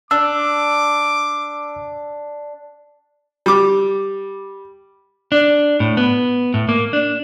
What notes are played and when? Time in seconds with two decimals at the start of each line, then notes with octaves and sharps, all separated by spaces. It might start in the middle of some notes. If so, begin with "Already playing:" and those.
0.11 D4 D6 E6
3.46 G3 D6
5.32 D4
5.80 A2
5.97 B3
6.54 A2
6.69 A#3
6.93 D4